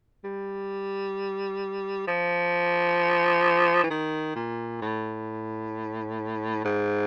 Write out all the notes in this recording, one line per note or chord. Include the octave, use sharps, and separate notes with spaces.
G3
F3
E3
D#3
A#2
A2
G#2